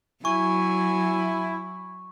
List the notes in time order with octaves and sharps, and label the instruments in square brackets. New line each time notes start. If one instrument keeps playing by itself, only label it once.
[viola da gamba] F#3 [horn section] E4 [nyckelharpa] G#5 [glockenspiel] C#6